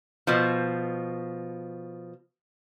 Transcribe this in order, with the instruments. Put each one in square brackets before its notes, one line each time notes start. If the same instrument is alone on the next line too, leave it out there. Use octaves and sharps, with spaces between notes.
[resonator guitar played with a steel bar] B2 F3